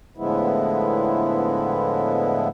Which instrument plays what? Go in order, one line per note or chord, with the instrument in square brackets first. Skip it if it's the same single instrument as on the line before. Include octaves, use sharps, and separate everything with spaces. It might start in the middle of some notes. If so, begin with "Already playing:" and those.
[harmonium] A2 D3 F3 G#3 B3 E4